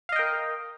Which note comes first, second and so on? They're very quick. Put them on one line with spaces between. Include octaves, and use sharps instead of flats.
F5 D#5 G5 A#4